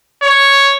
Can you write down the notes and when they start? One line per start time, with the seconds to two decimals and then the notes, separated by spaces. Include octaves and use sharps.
0.23 C#5